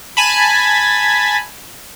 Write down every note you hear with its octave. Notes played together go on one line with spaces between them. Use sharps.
G#5 A5 B5